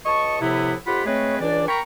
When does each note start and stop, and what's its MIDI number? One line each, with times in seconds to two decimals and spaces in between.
0.06 0.41 37
0.06 0.41 75
0.06 0.41 81
0.06 0.41 85
0.41 0.74 45
0.41 0.74 48
0.41 0.74 53
0.41 0.74 59
0.41 0.74 64
0.87 1.03 41
0.87 1.03 65
0.87 1.03 67
0.87 1.03 78
0.87 1.03 83
1.06 1.37 56
1.06 1.37 57
1.06 1.37 60
1.06 1.37 68
1.06 1.37 71
1.06 1.37 73
1.40 1.65 37
1.40 1.65 52
1.40 1.65 62
1.40 1.65 74
1.69 1.81 70
1.69 1.81 79
1.69 1.81 82
1.69 1.81 83
1.69 1.81 85